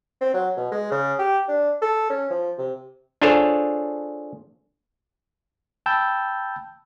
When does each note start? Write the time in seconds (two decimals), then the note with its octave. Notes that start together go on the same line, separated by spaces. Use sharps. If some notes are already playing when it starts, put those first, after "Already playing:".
0.21 C4
0.34 F#3
0.57 B2
0.72 G#3
0.91 C#3
1.19 G4
1.48 D4
1.82 A4
2.10 C#4
2.30 F3
2.58 C3
3.22 D4 F4 G#4 A4 C5 C#5
5.86 G5 A5 B5 E6 G6